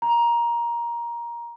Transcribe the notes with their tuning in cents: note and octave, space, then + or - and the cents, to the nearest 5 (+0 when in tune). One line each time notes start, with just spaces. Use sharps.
A#5 +15